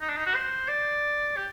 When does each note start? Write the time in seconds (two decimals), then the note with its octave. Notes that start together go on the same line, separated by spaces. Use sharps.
0.01 D#4
0.09 D4
0.17 D#4
0.26 F#4
0.35 C5
0.68 D5
1.36 G4